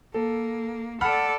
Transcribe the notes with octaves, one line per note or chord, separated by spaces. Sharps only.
A#3 A4
A4 D5 F#5 B5 F6